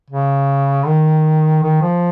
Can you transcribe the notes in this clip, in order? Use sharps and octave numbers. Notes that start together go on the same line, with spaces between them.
C#3
D#3
D#3
F3